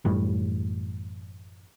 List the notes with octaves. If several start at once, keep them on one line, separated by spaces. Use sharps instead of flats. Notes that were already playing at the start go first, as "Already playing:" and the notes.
A1 F#2 A2 G3